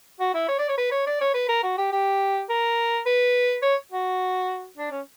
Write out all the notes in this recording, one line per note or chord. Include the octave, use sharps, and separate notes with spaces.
F#4
E4
C#5
D5
C#5
B4
C#5
D5
C#5
B4
A#4
F#4
G4
G4
A#4
B4
C#5
F#4
D4
C#4